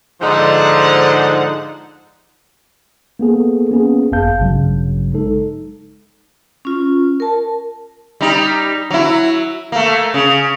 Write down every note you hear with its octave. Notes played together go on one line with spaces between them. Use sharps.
G#2 D3 F3 D#4 C5 F#5
A#3 B3 G#4 A4
A#3 B3 C#4 G#4
G#1 F#2 G#4 F5 A5 G6
A1 G2 C#3 F#3
G#3 D#4 A4
C#4 F4
A#4 A5
G3 D#4
F#3 E4
A3 A#3
C#3